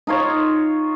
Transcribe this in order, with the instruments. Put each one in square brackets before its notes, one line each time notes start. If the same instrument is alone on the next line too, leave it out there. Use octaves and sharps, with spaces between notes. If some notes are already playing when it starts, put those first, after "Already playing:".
[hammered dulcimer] D#4 F4 C#5